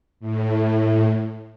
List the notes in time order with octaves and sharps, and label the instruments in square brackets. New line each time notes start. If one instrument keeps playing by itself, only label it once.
[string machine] A2